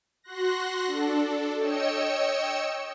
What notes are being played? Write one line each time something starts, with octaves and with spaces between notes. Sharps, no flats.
F#4 C6 F#6 A#6
D4 A4
C#5 D#5 G5 E6 C#7 E7